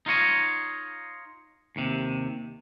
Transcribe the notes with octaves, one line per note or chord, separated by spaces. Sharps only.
D#4 F4 C#5 D#5
D#2 C3